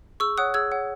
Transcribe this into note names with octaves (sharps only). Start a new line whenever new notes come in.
G#4 C#6 E6
C#5 F#5 D#6 F#6
G#4 E6 G#6
C#5 F#5